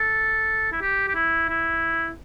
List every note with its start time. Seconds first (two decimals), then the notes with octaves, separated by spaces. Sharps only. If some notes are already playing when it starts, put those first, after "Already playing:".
Already playing: A4
0.72 E4
0.81 G4
1.08 G4
1.15 E4
1.49 E4